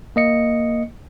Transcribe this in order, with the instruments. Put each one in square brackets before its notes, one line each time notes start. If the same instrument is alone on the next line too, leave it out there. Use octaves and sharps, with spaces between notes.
[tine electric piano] A#3 D#5 C#7